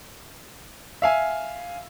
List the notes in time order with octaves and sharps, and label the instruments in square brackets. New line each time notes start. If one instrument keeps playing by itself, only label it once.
[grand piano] E5 F5 G#5